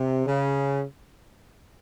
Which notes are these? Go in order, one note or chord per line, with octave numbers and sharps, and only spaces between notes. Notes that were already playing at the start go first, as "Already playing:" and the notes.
Already playing: C3
C#3